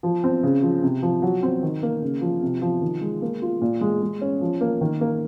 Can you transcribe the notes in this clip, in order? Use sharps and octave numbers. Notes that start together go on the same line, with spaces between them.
F3
C4
C#3
F3
C3
F3
F#3
C4
D#3
A#3
C#3
F3
C3
F3
D#3
G#3
A#3
F4
A#2
G#3
G#3
C#4
F3
A#3
D#3
A#3